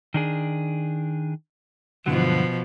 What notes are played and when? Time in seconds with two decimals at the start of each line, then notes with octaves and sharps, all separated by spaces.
0.14 D#3 D4 G#4
2.06 G2 B2 D3 F3 F#3